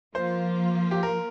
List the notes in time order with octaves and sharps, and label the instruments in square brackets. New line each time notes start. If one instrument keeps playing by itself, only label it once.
[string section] F3 A#3 F4 [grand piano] C5
[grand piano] G4
A#4